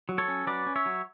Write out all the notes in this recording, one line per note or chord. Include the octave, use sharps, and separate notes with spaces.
F#3
A4 C#5
C#4
F#3 B4 D5
C#4
C#5 E5
F#3